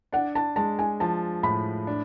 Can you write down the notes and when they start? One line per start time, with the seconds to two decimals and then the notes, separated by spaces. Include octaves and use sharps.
0.12 D4 F#5
0.35 A5
0.56 G#3 A5
0.79 G#5
1.00 F3 A5
1.43 A2 B5
1.87 D4